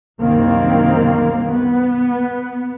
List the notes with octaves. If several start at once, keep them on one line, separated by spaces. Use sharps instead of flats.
F#1 C2 D#3 A#3 C4
B3